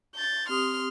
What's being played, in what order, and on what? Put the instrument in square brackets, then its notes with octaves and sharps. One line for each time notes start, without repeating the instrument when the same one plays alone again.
[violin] G6 A6
[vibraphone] C4 G4 D#6 [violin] C6 F6